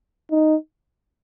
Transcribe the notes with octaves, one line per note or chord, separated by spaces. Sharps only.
D#4